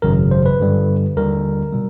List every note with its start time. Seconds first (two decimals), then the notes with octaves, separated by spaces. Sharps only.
0.02 G#1 F#2 C#3 F#3 A#4
0.31 C5
0.46 B4
0.59 G2 D3 G3
1.16 D#2 D3 G3 A#4
1.73 B2 G3